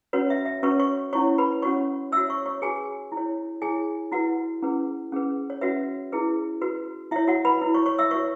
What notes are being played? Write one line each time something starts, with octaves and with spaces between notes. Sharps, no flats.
C#4 F#4 B4 C#5
E5
E5
C#4 F#4 B4 C#5 C#6
C#5 C#6
C#4 E4 C#5 C#6
B4 B5
C#4 F#4 C#5 C#6
F#4 C#5 E5 E6
C#5 C#6
C#5 C#6
F#4 G#4 B4 G#5
E4
C#5
E4 G#4 C#5 G#5
E4 F#4 B4 F#5
C#4 E4 G#4 B4
C#4 G#4 B4
C#5
C#4 F#4 B4 E5
E4 G#4 B4
F#4 B4
E4 C#5 E5
F#4 F#5
B4 B5
E4 B4
C#5 C#6
C#5 C#6
E5 E6
F#4 B4 C#5 C#6